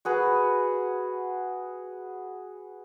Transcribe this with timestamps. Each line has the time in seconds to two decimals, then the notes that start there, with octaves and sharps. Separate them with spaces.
0.05 F#4 G#4 B4